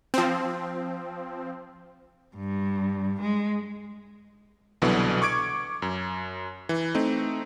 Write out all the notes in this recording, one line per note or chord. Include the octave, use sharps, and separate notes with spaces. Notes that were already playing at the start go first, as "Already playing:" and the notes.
F3 C4
G2
G#3
C2 B2 D3 E3 F#3
C#6 D6 G#6 D7
F#2
E3
A3 C4 D#4